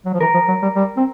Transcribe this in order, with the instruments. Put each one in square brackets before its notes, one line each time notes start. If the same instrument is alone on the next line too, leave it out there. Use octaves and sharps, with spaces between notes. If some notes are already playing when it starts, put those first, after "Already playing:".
[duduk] F#3
F3
[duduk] E3 [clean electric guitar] A#4
[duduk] F3
F#3
G3
G3
C4